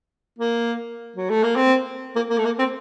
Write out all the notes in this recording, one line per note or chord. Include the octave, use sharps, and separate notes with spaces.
A#3
F#3
A3
A#3
C4
A#3
A#3
A3
A#3
C4